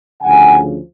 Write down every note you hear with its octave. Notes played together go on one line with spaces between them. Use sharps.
D2 C#3 F3 F#5 G#5